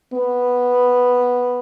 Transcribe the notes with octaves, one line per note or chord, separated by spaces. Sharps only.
B3